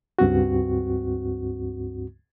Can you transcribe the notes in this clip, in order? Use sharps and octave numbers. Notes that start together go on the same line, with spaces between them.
C#2 G2 C4 F#4